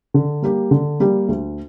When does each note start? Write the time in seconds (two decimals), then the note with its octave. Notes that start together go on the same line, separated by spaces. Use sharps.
0.14 D3
0.42 G3 A#3 G4
0.71 D3
1.00 G3 A#3 G4
1.28 D2